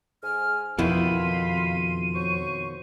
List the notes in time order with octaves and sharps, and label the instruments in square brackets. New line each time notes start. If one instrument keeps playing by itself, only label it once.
[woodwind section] G#2 G#5 F6
[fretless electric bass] F2 [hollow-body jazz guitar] B2 D#3 E4 [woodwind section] F5 B5 C6 [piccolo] D#7
[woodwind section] F#3 C5 C#6